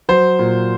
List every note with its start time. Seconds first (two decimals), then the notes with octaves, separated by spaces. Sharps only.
0.09 F#3 C5
0.39 A#2